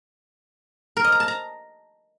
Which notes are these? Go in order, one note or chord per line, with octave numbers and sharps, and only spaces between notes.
A#4
D#5
A#5
A5
A#5